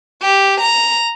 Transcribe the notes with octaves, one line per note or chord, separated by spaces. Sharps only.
G4
A#5